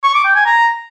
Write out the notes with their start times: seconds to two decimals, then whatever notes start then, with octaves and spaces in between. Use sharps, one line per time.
0.04 C#6
0.14 D6
0.25 G5
0.35 G#5
0.46 A#5